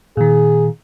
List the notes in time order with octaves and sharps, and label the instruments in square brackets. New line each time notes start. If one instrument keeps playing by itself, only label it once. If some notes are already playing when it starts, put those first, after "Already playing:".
[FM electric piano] A#2 D#3 [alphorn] G#4